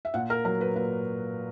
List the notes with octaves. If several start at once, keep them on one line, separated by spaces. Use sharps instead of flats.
E5
A#2 F#5
A#4
F#3 A#4
B4
A#2 B4